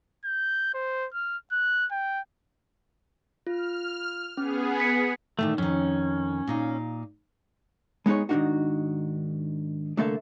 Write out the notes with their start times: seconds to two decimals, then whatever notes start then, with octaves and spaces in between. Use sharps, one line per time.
0.25 G6
0.74 C5
1.14 F6
1.52 F#6
1.91 G5
3.47 F4 F6
4.37 B3 C#4 G#4
4.80 B6 C#7
5.39 A#2 D#3 E3 A3
5.58 F2 D#3 C#4
6.47 A#2 D#4 F5
8.06 G#3 B3 D#4 G#4 C#5
8.29 G#2 D#3 F#3 D4 D#4 F#4
9.97 C2 D3 A3 A#3 A4 E5